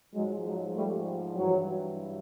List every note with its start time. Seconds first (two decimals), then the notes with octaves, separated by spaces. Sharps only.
0.14 G#2 F3 F#3 G#3
0.44 F#3 G#3
0.74 G3 A3
1.36 G2 E3 F#3